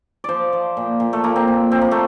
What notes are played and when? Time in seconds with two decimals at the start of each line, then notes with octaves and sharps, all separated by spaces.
0.24 F3 C5 D5
0.53 F3
0.77 A#2
1.00 A#2
1.13 A3
1.24 A#2 A#3
1.36 C4
1.48 A#2
1.71 F3 C4
1.81 A#3
1.91 A3